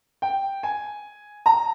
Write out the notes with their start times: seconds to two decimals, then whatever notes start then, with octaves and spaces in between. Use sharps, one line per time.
0.22 G5
0.63 G#5
1.46 A#5